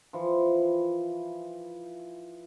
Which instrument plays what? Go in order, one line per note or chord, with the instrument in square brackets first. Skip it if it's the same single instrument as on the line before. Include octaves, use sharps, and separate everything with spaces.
[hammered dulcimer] E3 F3